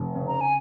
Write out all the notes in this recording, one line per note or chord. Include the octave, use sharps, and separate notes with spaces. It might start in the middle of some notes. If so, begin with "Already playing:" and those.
Already playing: F1
C#3
A#5
G#5